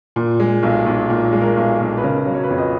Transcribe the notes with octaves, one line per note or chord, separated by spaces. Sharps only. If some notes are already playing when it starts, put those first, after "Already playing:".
A#2
G#3
B1
B1
A#2
G#3
A#4
B1
B1
B4
C#3 A#4
F#3
C#5
B4
F2 C#5
D#5